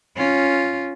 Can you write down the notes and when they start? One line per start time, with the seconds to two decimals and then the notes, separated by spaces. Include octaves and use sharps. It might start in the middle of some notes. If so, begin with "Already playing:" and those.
0.17 C#4 F4